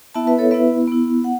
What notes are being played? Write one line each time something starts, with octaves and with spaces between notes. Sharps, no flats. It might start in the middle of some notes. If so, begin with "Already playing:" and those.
B3 E4 E5 A5
B4 E5
A4 C#5
B3 E4 B4 E5
B3 E4
F#5